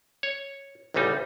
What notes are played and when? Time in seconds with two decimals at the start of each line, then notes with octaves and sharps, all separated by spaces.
0.23 C#5
0.94 A1 D2 C#3 G3 D#4